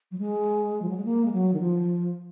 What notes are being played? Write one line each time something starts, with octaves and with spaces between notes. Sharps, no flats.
F#3
G#3
F3
F#3
G#3
A#3
G#3
F#3
D#3
F3